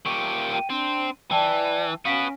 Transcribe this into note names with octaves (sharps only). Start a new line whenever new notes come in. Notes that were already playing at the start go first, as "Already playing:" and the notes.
A#2 G4 C#6
G5 D#7
C4 D4
E3 D5 G5 A5
B3 C#4 F#4 F5 B6 D7